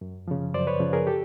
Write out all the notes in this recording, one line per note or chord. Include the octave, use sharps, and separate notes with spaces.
F#2
C#3 F3
F#2 C5 D5
B4 C#5
C#3 F3
G#4 A#4
G4 A4